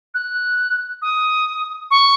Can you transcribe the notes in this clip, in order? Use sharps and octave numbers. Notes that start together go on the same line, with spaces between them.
F#6
D#6
C#6